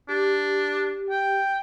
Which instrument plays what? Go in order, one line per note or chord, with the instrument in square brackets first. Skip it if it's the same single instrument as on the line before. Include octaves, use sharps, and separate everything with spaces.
[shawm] D4 [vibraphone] G4
[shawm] G5